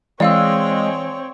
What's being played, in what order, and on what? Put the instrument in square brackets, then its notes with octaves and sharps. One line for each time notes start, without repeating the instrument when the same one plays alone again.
[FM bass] E3 [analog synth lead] G#3 [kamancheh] C4 C#5 [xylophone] D5 F5 E6